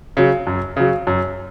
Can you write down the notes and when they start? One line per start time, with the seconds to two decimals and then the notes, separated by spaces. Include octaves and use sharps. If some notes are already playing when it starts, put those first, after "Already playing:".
0.17 C#3 F#3
0.47 F#2
0.77 C#3 F#3
1.07 F#2